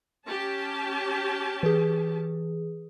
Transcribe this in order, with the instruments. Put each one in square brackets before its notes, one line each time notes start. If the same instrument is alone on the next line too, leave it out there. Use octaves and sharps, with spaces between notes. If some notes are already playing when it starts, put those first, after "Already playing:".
[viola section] C#4 G4 A5
[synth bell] E3 G#4